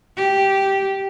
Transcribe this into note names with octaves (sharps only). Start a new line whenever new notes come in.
G4